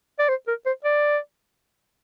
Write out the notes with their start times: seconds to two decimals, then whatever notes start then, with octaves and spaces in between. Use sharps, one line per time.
0.19 D5
0.29 C5
0.48 A#4
0.66 C5
0.85 D5